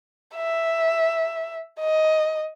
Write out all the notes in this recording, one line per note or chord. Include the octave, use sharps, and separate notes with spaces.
E5
D#5